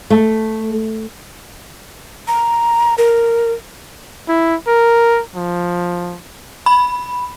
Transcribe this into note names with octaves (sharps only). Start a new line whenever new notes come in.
A3
A#5
A#4
E4
A#4
F3
B5